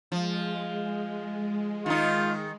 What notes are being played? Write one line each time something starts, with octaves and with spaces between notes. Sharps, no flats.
F3 G#3
D#3 D#4 F4